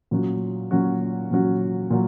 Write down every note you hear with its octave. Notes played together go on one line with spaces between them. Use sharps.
A#2 F#3 C#4 F#4
A#2 F#3 C#4 F#4
A#2 F#3 C#4 F#4
A#2 F#3